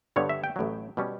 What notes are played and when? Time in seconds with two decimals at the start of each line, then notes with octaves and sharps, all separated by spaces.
0.16 G2 D3 G3 B3 C#5
0.29 E5
0.44 G5
0.56 A1 A2 F#3
0.97 B2 G3 C#4